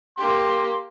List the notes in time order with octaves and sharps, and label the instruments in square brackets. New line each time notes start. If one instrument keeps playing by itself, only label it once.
[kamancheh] A#3 G4 [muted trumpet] C6